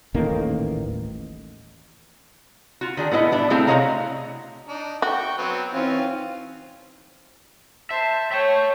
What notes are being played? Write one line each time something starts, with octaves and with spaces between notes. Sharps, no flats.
D#1 A1 D#3 A#3
F4 F#4
D#3 D4 G#4
A2 B3 E4 D#5
G3 D4 E4
A3 C4 E4 G#4 F5 G5
C3 F#4 C#5 D#5 F5 A#5
D4 D#4
F#4 G5 C#6
F#3 B3 C4
E3 C4 C#4 D#4 F4
C5 E5 A5
C#5 E5 G5 A5